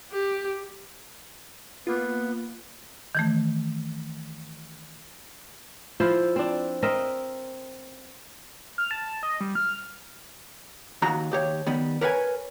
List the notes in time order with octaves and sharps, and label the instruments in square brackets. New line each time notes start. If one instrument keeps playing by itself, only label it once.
[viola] G4
[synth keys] A#3 F4 [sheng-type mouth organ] B3
[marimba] D#3 E3 A3
[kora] F3 E4 F4 C5
C4 D4
C4 A#4 D#5 E5
[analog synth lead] F6
A5
D#5
G3
F6
[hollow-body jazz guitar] D#2 F#4 A#5
D#2 G4 C#5
D#3 G3 B3
A#4 B4 C#5 F#5 G#5